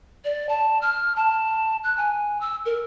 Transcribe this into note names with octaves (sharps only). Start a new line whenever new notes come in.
D5
A5
F6
A5
F#6
G#5
E6
A#4